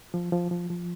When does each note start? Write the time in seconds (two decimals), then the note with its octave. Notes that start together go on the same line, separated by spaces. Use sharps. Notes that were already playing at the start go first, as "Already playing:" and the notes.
0.14 F3
0.32 F3
0.51 F3
0.70 F3